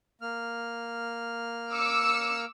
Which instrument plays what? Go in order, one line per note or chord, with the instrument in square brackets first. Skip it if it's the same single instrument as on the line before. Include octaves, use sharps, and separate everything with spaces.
[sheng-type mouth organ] A#3 F6
[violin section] D6 E6 C#7